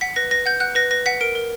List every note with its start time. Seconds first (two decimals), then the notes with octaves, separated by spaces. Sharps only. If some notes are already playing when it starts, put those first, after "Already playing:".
0.01 F#5 B6
0.16 B4 A#6
0.31 B4 A#6
0.46 F#5 G6
0.60 F#5 F#6
0.75 B4 A#6
0.91 B4 A#6
1.06 F#5 B6
1.21 A#4 D7
1.35 A#4